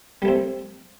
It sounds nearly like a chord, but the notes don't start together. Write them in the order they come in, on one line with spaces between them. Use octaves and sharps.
G3 A3 C4